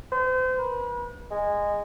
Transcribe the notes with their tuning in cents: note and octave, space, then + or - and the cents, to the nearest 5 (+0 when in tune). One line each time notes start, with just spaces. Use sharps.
C5 -35
B4 -40
G#3 -15